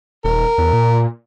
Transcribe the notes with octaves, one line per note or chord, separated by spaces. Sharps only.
D#1 A#4
E2
A#2